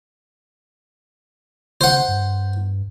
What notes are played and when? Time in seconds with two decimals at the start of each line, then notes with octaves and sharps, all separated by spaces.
1.81 C#3 C5 F#5
2.08 G2